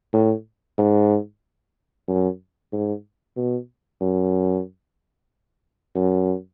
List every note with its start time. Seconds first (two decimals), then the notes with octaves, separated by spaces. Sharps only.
0.13 A2
0.78 G#2
2.08 F#2
2.73 G#2
3.37 B2
4.01 F#2
5.95 F#2